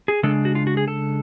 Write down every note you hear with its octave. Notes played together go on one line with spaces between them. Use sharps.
G#4
C#3 G#3 D4 A4
F#4
F4
F#4
G#4
A4